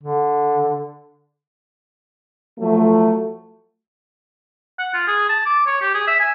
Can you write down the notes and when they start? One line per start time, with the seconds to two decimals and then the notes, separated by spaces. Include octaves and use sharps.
0.03 D3
2.59 F3 F#3 A3
4.79 F#5
4.94 F4
5.08 G#4
5.29 A5
5.46 D6
5.67 C#5
5.81 G4
5.94 G#4
6.07 E5
6.20 G#5